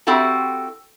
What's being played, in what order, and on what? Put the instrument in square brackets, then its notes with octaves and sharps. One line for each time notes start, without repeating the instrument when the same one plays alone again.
[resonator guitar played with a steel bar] C4 E4 F#4 G4 A4